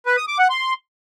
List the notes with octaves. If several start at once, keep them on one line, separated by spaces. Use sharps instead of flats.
B4
D#6
D6
F#5
C6